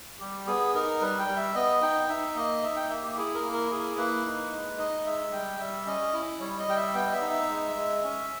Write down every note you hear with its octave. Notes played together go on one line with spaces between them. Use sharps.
G3 G4
B3 G#4
D#4 A#4
G3 B4
G5
G3
E5
B3 D#5
D#4 G5
D#4 E5
A#3 D#5
D#4 E5
G5
A#3 E5
G4
E4 G#4
A#4
A#3
A#4
E4 G#4
A#3 B4
D#4
G#3
D#4 D#5
G#3 E5
G3 G5
G3 E5
C#4 D#5
E4
G3 C#5
D#5
G3 G5
E5
B3 G5
D#5
E5
D#4
E5
G#3
G#3
C#4